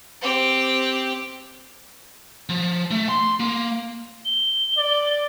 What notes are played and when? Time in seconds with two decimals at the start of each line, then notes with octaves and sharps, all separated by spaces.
0.22 C4 G4
2.49 F3
2.91 A3
3.09 C6
3.40 A#3
4.25 G7
4.77 D5